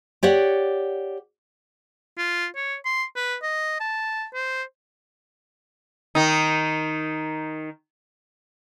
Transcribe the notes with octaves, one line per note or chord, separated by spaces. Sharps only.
G4 C#5 D5 F#5
F4
C#5
C6
B4
D#5
A5
C5
D#3 D#4